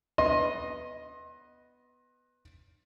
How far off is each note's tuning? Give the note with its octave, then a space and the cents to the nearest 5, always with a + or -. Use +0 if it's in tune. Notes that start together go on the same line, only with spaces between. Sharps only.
B3 +0 D#5 +0 C6 +30